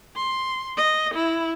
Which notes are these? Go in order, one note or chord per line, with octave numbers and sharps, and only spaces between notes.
C6
D#5
E4